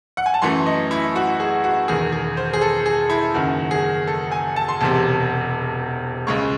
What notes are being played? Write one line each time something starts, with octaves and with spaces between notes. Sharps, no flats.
F#5
G#5
A5
F#2 E3 A3 C6
D#5
E4
F#4
G#4
F#4
E1 E2 D#3 G#4
G#4
C5
G#4
A4
G#4
E4
F#1 F#2 D#3 F#4
G#4
A4
G#5
A5
C6
E1 E2 C3 A5
C#2 C#3 G#3 C#6